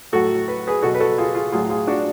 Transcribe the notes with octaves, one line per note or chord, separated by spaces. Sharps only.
A2 F#3 F#4 A4
B4
G#4 B4
B2 F#3 F#4 A4
B4
F#4 A4
F4 G#4
F4 G#4
A2 F#3 F4 G#4
F4 G#4
D4 F#4